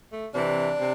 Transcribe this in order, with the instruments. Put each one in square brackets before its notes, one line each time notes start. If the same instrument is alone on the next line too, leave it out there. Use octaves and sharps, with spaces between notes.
[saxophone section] A3
C3 E3 D4
C3